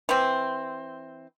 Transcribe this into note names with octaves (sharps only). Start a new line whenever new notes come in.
E3 C4